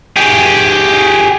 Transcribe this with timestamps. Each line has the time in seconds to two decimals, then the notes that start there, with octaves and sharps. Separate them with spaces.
0.16 G4 G#4